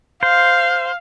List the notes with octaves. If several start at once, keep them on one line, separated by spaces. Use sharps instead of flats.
C5 F5